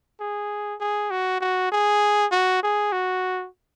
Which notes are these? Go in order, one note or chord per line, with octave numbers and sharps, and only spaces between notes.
G#4
G#4
F#4
F#4
G#4
F#4
G#4
F#4